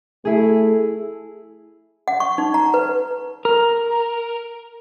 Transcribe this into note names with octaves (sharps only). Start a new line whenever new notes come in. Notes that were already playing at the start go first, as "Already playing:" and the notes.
A3 E4 G#4
F#5
C#6
D#4
A#5
B4
A#4